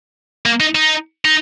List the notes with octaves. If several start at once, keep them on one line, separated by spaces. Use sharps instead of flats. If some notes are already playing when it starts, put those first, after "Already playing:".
A#3
D#4
D#4
D#4